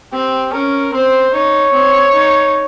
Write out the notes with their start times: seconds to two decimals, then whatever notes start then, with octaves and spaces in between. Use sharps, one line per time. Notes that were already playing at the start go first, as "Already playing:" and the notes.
0.12 C4 G4
0.53 C#4 A#4
0.93 C4 C5
1.33 D#4 C#5
1.73 C4
2.14 D#4